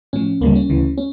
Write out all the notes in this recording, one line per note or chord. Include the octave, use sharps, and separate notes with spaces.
A2 F3 C#4
D2 C#3 G3 A#3
C#4
D2 C#3 E3
C#4